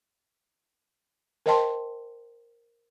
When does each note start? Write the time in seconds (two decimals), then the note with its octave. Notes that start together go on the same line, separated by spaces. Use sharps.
1.46 A#4 C5 D#5 G5 A5 C6